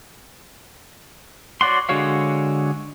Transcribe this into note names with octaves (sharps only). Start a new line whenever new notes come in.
F#4 C#5 D5 F#5 C6
D3 G#3 F#4 C#5 F5